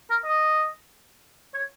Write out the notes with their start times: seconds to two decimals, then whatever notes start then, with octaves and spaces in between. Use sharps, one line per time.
0.10 A#4
0.25 D#5
1.54 C#5